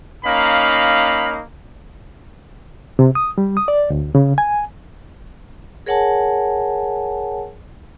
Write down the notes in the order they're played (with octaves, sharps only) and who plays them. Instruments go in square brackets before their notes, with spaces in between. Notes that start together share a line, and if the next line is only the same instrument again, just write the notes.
[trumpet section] A#3 C#4 D#4 F5 B5
[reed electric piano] C3
D#6
G3
D#6
D5
D2
C#3
G#5
[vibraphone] G#4 A#4 C#5 F#5 G#5 A5